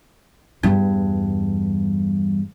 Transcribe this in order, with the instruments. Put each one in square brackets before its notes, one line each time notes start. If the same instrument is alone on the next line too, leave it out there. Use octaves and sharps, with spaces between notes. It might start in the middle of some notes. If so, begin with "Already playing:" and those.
[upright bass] E2 G2